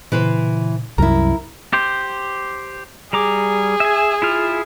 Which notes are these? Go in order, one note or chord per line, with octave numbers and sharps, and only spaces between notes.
A#2 C#3 E3 B4 C5
C2 F#2 E4 A#4 A#5
G4 C5
G3 G#4 A#5 D6
E5 G#5
E4 F4 F6